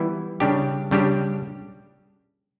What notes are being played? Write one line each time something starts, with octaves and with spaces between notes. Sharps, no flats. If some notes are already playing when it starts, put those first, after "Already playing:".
Already playing: E3 G3 B3 E4
C#3 G3 D4 G4
C#3 G3 D4 G4